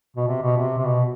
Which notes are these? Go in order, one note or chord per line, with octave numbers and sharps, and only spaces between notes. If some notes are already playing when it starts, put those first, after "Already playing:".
B2
C3
B2
C3
C3
B2